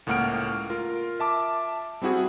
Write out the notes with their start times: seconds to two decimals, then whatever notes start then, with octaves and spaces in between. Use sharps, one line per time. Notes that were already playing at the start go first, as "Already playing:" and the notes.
0.07 C#2 A2 A#3 F#5 F6 D7
0.70 F4 A#4
1.20 E5 A5 D6
2.02 G3 C4 E4 F#4 G#4